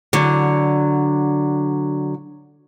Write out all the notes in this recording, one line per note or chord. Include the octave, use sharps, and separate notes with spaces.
D3 F#3